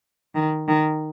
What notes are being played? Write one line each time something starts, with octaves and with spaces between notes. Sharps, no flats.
D#3
D#3